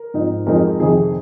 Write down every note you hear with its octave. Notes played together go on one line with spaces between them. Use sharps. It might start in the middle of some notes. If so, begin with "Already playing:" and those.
Already playing: A#4
G#2 F3 C4 D#4
F2 F3 G#3 C4 D#4 A#4
F2 C3 D#3 G#4